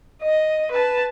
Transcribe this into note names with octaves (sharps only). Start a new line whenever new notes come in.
D#5
B4 A5